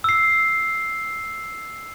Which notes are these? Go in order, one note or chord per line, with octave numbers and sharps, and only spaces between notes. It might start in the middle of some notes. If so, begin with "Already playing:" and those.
E6 C7